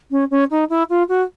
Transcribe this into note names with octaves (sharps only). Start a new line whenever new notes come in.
C#4
C#4
D#4
E4
F4
F#4